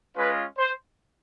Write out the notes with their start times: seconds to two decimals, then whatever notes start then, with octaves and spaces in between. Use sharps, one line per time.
0.16 G#3 C#4 F4 B4
0.58 C5